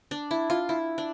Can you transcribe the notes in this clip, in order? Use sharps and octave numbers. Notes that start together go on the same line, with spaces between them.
D4
E4
F4
E4
D4